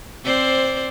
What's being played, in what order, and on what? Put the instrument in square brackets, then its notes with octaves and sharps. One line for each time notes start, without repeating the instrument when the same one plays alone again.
[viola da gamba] C4 C5 D5